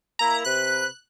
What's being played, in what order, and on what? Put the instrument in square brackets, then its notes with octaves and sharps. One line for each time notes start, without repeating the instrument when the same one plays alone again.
[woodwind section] A#3 E4 [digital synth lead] A#5
[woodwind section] C3 B4 [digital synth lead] F#6